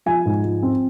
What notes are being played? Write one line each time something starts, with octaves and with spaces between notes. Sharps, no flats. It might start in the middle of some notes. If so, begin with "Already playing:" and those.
F3 G#5
G#2
F3
C4